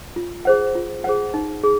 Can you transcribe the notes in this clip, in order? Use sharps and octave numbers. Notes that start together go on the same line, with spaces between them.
F4
G#4 C5 F#5
F4
G#4 C5 F#5
D#4
G#4